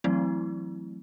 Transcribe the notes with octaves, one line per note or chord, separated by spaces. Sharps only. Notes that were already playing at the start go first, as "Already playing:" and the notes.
E3 F#3 A3 C4 E4